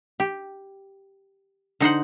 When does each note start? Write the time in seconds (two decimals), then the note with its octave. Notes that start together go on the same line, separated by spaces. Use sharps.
0.20 G4
1.80 D3 D#4 C5 F#5